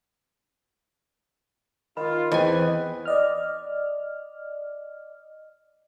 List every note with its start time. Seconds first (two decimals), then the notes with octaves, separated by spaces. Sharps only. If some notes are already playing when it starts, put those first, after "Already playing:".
1.97 D#3 F4 B5
2.32 E2 B3 C4 B4 D#5 G5 G#5
3.05 D5 D#5 F6